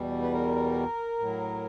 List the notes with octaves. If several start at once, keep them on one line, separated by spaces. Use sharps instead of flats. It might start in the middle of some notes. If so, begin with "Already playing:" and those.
Already playing: E2 B2 G3
B4
A#4
A2 F#3